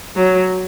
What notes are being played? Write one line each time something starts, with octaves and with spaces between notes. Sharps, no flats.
F#3